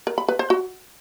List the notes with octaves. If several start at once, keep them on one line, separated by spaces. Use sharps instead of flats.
A#4
B5
B4
C5
F#4